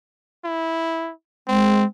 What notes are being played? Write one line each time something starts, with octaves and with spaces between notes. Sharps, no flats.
E4
G#3 C4